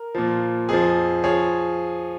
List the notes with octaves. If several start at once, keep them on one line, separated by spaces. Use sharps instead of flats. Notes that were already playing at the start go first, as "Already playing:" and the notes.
Already playing: A#4
A#2 F3
F2 F3 G#4
F3 G#4 C#5